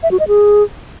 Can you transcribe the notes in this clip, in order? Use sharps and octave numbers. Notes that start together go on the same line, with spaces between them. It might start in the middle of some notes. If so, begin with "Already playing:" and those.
E5
F#4
D#5
G#4